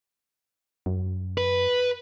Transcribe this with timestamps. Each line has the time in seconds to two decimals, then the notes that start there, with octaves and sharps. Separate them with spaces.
0.86 F#2
1.38 B4